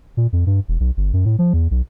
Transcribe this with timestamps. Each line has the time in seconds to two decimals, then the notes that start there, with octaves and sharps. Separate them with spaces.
0.17 A#2
0.33 F2
0.46 G2
0.68 E1
0.80 B1
0.97 G1
1.13 F#2
1.25 A2
1.39 F3
1.53 E2
1.71 B1